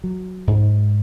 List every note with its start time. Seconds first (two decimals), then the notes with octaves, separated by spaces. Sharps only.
0.04 F#3
0.47 G#2